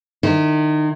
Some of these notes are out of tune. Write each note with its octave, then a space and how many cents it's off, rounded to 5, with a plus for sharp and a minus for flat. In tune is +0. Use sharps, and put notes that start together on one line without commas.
D#3 -30 E4 -20